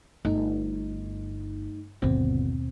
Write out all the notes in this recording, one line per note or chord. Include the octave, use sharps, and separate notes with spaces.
G1 A3 D#4
G1 D#2 B2 D3 C4